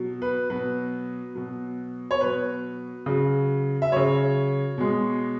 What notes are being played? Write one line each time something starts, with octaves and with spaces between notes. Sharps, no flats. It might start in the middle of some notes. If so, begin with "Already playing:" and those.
Already playing: B2 F#3
B4
B2 F#3 B4
B2 F#3
C#5
B2 F#3 B4
C#3 F#3
E5
C#3 F#3 C#5
B2 G#3